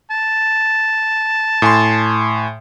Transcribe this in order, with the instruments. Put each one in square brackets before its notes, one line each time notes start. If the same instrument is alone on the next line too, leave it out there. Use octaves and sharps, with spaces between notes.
[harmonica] A5
[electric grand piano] A2 G#5 C6